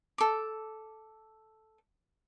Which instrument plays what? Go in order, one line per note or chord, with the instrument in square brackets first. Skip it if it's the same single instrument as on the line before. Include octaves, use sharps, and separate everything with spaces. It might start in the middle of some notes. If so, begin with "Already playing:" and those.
[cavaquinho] A4 D6